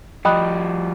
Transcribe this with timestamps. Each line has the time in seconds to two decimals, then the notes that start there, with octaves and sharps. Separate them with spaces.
0.25 F3 G3 D#5 G5 B5 D#6 F#6